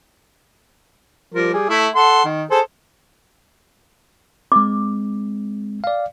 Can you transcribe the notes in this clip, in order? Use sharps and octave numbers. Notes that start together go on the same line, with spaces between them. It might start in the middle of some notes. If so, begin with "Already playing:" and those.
F3 G3 A#4
G3 G#4
A3 E4
A4 F#5 C6
D#3
G#4 A4 C5
G#3 C4 D6
D5 F5